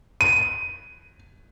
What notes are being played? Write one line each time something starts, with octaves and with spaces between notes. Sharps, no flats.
D#7